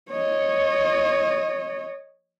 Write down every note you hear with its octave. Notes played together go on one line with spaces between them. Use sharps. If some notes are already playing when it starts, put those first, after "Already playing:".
C#5 D#5